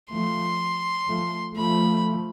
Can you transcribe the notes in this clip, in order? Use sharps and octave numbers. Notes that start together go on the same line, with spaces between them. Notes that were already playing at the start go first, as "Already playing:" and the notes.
F3 A3 C6
F3 A3
F3 A3 B5